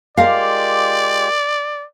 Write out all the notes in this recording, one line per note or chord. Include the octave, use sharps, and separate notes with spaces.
G#3 F4 G4 A#4 D5 F5